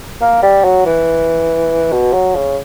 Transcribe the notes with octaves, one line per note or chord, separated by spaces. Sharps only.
A#3
G3
F#3
E3
B2
F#3
C#3